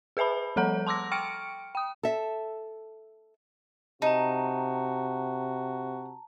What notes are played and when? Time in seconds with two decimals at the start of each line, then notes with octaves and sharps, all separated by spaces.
0.17 G#4 B4 E5 A5 B5
0.56 F3 G3 A4 F#5 A#5 G6
0.87 A5 C6 D6 E6 A#6
1.12 G5 C#6 F6 C#7 D7
1.75 G5 D#6
2.03 A4 E5
4.02 C3 D#4 F#4 A5 A#5